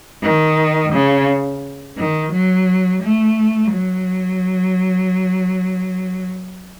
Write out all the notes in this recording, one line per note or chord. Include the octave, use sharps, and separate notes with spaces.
D#3
C#3
D#3
F#3
A3
F#3